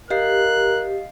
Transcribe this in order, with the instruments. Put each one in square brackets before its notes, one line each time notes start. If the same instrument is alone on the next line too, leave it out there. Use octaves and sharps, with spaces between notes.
[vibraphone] G4 [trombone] A#4 [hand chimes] D#5 F5 C7 [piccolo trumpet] F#6